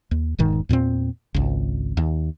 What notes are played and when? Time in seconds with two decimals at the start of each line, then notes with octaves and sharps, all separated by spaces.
0.11 D#2
0.39 E1 G#2 D#3
0.69 E2 A#2 A#3 C4
1.34 G#1 C#2
1.97 D#2